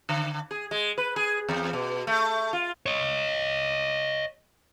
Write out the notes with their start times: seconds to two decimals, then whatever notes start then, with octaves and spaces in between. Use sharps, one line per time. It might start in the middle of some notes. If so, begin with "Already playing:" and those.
0.09 D3
0.51 G#4
0.71 G#3
0.98 B4
1.16 G#4
1.49 E2
1.73 B2
2.07 A3
2.53 F4
2.86 C#5 D#5